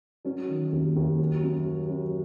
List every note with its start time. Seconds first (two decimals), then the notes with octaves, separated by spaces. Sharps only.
0.25 F#3 C#4
0.49 D#3
0.72 D#2
0.96 D#2
1.19 F#3
1.43 F#2
1.66 F#3
1.89 F#2